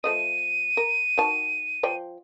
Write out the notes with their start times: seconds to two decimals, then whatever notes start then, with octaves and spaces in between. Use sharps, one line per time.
0.04 F3 A3 D#5 D#7
0.77 A#4
1.18 D#3 F#4 A5
1.83 F3 D5 G5